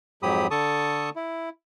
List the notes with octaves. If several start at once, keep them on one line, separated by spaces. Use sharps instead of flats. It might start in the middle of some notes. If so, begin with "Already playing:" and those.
F2 G#2 F#3 G4 B5 D#6
D3 A4 A5 C#6 D#6
E4